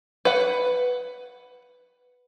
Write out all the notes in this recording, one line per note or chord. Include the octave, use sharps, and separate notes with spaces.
B4 F#5